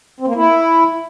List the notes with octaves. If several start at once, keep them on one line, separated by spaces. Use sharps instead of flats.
C4
A#3
E4